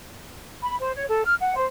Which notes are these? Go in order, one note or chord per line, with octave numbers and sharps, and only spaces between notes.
B5
C5
C#5
A4
F6
F#5
C5